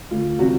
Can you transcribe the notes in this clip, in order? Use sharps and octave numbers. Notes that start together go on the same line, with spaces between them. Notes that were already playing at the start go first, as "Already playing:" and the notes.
D2 F4
C3 E3 G3 C4 F#4